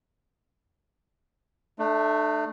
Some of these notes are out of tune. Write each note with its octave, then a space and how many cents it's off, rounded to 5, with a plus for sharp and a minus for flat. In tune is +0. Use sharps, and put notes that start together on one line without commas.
A3 +0 D4 +35